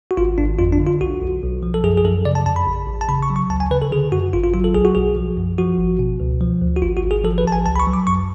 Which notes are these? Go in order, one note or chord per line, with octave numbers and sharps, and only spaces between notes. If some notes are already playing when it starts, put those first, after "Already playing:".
F#4
G#1 F4
G#1 D4
F2 F4
D4
D3
F4
B1 F#4
B1
B1
F3
A4
F#2 G#4
G#4
F#2 A4
C#3 D5
A5
F2 A5
B5
A1
A1
A5
C#3 B5
C#6
F#3
C#6
D2 A5
G#5
C#3 B4
A4
D3 G#4
F#2 F#4
G#1 F4
F4
F#3 F4
A4
B1 G#4
F#4
B1 G#4
F3
F#2
F3 F#4
G#1
B2
C#2
F3
D2
F#4
G#1 F4
F#4
G#1
G#4
F3 A4
B4
A1 A5
G#5
C#2 A5
B5
C#6
F#3
D6
F#2 C#6